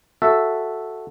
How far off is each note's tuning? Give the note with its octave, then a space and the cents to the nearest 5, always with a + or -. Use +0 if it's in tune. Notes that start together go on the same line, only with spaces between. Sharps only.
F#4 -5 A4 +0 E5 +0